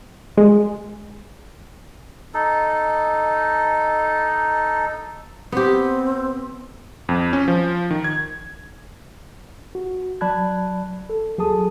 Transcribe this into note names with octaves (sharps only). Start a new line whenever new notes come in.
G#3
D#4 A4
B3 C4 G4
F2
C#4
F3
D#3
G#6
F#4
F#3 D5 A5 B5 F#6 G#6
A4
D#2 F#3 G#4 A4 A5 D#6